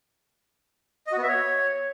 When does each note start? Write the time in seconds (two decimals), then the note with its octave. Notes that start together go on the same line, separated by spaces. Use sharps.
1.07 D#5
1.12 F#4
1.17 B3
1.23 E5
1.28 C#5